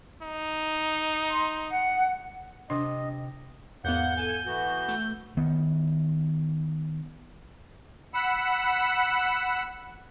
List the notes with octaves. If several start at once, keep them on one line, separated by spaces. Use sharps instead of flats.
D#4
C6
F#5
C3 D4 D#5
E2 G#2 A#3 B3 F#5 G6
A4 G#5
E3 B3 F#4
A3
D#3 B3
F#5 B5 E6